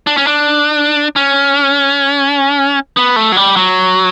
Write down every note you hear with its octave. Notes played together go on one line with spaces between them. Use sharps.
D4
C#4
D4
C#4
B3
A3
F#3
G3
F#3